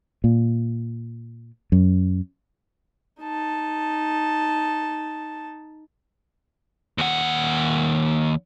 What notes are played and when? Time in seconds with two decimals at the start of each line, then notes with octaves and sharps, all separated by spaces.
0.24 A#2
1.72 F#2
3.21 D#4 A5
6.98 D#2 F#5